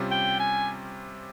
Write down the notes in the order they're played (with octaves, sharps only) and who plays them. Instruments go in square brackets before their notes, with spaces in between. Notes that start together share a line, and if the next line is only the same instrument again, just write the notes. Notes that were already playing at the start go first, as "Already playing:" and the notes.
Already playing: [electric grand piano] C3 G3 C#4 F4
[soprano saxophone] G5
G#5